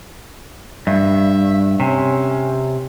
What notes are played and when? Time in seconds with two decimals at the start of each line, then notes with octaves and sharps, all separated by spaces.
0.87 G2 E5
1.80 C3 C#4